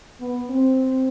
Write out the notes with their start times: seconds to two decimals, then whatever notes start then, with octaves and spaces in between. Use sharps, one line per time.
0.20 B3
0.49 C4